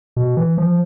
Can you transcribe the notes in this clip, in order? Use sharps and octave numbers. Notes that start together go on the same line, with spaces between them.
B2
E3
F3